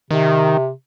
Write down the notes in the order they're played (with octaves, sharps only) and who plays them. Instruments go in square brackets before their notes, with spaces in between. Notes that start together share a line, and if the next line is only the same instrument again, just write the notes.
[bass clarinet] C3 [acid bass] D#3